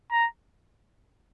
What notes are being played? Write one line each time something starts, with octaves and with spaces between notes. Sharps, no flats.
A#5